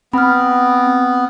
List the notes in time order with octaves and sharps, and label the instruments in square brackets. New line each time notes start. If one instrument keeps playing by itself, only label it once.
[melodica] B3 [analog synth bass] C4 [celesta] B5 F6